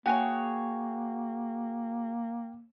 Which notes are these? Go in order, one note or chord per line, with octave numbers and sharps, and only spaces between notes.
A#3 F#4 G#4 C#5 G5